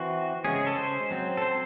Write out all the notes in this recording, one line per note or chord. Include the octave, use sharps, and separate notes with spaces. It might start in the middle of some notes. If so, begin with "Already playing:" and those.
Already playing: E3 C4 F#4
C#3 G#3 C#4 G#4
G#4
A4
C5
F#3 C4
A4
C5